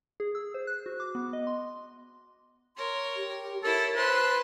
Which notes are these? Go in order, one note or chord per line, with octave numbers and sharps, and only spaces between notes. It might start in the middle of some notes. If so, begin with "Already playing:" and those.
G#4
E6
C5
F#6
F#4
D6
B3
D#5
C6
A#4 C#5 C6
G4
E4 A4 A#4 C#5
B4 C5 A5 C6